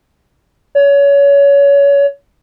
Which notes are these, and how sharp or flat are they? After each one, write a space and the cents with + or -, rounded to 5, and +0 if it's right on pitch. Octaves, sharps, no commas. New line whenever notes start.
C#5 +25